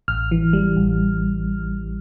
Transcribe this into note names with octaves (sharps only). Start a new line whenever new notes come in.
A1 F6
E3
G3
A1